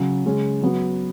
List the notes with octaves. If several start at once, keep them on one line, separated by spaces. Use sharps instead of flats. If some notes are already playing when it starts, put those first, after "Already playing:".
Already playing: C#3 F#3 C#4
C#3 G#3 C#4 G#4
F#3 B3 F#4